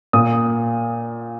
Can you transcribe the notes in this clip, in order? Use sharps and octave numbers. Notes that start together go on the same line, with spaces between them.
A#2 A#3 D#6